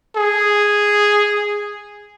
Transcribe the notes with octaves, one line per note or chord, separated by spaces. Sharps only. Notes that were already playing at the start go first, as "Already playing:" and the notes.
G#4